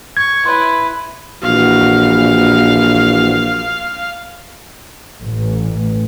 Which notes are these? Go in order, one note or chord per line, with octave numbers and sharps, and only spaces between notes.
C#6 G#6
E4 B4 C#5 C6
A#1 E3 F#4 F5
A1